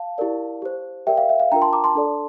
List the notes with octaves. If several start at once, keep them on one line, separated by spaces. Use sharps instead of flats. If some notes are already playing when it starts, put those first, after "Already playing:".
Already playing: F5 A5
E4 G4 A#4 D5
G4 C5
G4 A#4 D5 E5 G5
F5
E5
F5
D4 F4 A#4 G5 A#5
A5 C6
A#5 D6
A5 C6
D4 A4 D5